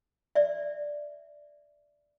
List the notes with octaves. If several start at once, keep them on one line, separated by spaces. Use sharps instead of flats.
D5 E5